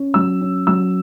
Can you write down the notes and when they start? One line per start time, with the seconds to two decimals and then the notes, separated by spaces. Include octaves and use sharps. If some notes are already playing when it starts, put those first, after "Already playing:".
Already playing: C#4
0.14 F#3 E6
0.41 C#4
0.67 F#3 E6